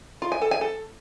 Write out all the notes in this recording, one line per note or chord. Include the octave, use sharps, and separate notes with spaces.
F4
G#5
A4
G#5
A4